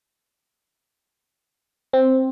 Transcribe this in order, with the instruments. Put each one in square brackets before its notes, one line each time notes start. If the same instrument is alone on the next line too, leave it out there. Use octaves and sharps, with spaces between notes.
[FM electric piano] C4